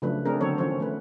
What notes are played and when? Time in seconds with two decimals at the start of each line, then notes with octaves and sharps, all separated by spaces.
0.02 C#3 F3 F#3 A3 D4 B4
0.25 A3 C4 D4 G#4 A#4
0.41 D3 F#3 B3 C4 A4 C#5
0.58 D#3 F3 C#4 C5 C#5
0.80 A3 B4